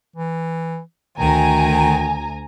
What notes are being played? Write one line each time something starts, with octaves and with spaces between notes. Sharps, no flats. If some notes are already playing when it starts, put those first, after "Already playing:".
E3
D2 D#3 G#5 A#5